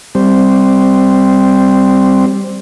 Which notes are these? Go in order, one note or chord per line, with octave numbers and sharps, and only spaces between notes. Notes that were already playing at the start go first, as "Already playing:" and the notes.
G3 C4